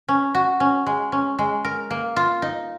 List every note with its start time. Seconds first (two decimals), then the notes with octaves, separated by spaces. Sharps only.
0.08 C#4
0.35 F#4
0.60 C#4
0.86 G#3
1.12 C#4
1.39 G#3
1.65 A#4
1.90 A#3
2.16 F4
2.42 D#4